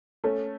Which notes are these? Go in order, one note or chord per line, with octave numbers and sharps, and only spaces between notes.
A3 C#4